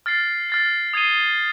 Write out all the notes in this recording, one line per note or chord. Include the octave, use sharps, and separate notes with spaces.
F6 A6 C7
F6 A6 C7
D#6 G#6 C7 D#7 G7